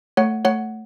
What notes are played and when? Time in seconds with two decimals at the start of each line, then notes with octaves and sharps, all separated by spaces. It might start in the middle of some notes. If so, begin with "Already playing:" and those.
0.17 A3 C#5 F#5
0.45 A3 C#5 F#5